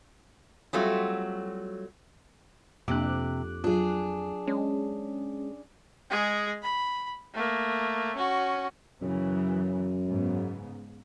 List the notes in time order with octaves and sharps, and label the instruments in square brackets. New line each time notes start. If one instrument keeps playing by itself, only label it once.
[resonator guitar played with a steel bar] F#3 G3 A3 C4 F4 F#4
[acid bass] F2 [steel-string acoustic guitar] C3 [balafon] A#3 D4 [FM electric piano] D6 F#6
[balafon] F#3 F4 [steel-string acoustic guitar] D4 G#4
[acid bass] G#3 [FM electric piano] C#4
[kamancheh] G#3 G#4
B5
A3 A#3
C#4 F#4
[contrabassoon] F#2 [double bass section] C#3 E3 F#3
[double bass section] G#2 C#3 B3